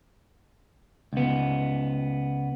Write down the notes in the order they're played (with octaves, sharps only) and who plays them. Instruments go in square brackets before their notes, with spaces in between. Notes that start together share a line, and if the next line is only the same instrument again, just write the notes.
[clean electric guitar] C#2 B3